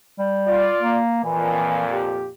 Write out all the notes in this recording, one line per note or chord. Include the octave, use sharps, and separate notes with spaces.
G3
F4 D5
A#3
F2 A#2 E3
G4